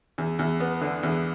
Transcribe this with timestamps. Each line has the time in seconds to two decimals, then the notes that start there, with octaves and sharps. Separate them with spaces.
0.18 E2
0.39 E2
0.60 B3
0.81 D3
1.03 E2